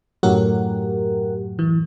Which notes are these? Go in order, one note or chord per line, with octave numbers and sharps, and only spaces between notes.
F#2 A2 F#3 G4 A#4 F#5
E3